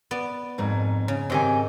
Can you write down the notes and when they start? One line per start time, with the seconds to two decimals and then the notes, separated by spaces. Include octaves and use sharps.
0.11 B3 D5
0.58 F2 G#2 D#3
1.08 C#3
1.30 G#2 D#3 C4 G4 G#5